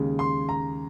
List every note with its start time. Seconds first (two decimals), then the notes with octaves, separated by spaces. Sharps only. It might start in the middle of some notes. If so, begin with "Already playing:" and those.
Already playing: D#2 C#3 G#3
0.19 C6
0.49 A#5